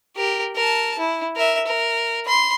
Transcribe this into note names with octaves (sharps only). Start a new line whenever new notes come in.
G4 A#4
A#4 A5
E4
A#4 E5
A#4
B5 C6